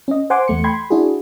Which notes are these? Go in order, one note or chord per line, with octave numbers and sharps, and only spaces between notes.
C#4 D#5
C5 F#5 G#5 C6 D6
E2 A3 C#7
G5 B5 C6 G#6
D4 E4 F#4 G#4